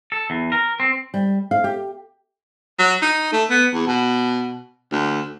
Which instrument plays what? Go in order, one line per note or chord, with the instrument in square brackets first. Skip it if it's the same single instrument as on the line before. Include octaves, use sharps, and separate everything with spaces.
[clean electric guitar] A4
E2
A#4
C4
[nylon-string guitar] G3
F5
G4
[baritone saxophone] F#3
D#4
A3
B3
E2
B2
D2